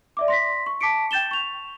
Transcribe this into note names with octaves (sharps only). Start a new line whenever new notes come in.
D5 E5 D6
C6 A#6 B6
C#6
A5 D6 B6 C#7 D7
G5 G6 A6 E7 G7
C#6 F7